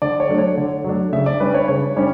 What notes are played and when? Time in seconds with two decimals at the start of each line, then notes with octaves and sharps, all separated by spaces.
0.02 D3 D5
0.20 C#5
0.29 F#3 A3 D4
0.38 C#5
0.57 D3
0.84 F#3 A3 D4
1.13 C#3 E5
1.26 D5
1.40 G3 C#4 B4
1.54 C#5
1.68 C#3 C#5
1.96 G3 C#4 C#5